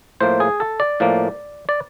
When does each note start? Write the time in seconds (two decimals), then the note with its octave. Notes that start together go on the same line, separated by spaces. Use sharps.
0.20 A2 F3 A#3 C5
0.40 G#4
0.60 A4
0.80 D5
1.00 A2 F3 A#3
1.69 D5